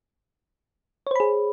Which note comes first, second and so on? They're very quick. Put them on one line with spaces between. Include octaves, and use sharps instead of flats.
C#5 C5 B5 G#4